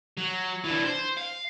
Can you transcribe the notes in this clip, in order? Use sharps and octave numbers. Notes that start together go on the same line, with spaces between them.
F#3
E3 D4
C5
F5